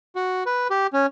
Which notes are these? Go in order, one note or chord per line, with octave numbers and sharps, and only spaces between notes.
F#4
B4
G4
C#4